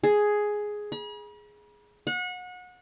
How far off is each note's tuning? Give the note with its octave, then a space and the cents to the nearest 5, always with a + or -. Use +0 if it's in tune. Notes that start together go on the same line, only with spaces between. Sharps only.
G#4 +5
B5 -45
F#5 -30